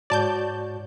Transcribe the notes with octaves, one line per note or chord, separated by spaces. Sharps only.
G#2 F#4 C#5 D5 A5 G6